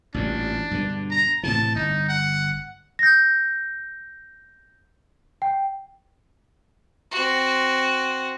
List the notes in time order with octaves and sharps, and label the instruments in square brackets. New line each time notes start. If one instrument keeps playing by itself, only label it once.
[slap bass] A1 G2 A#2 [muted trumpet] D4
[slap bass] G2 B2 D3
[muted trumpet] A#5
[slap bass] A2 C3 E3 [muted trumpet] A5
[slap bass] G1 [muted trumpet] D#4
[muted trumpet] F#5
[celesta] G6 A#6
G5
[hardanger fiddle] C4 F#4